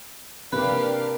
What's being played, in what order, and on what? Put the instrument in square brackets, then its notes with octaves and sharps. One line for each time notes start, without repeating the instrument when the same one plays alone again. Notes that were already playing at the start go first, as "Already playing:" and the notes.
[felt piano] C3 A#3 [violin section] D4 G4 F5 [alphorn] A#4 [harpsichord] B4